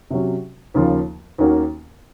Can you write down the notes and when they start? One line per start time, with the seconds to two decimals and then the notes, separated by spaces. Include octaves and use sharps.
0.10 C3 F#3 C#4
0.74 D#2 C#3 F3 A#3 F4
1.38 D#2 D#3 A#3 C#4 F#4